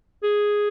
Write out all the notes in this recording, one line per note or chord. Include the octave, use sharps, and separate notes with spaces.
G#4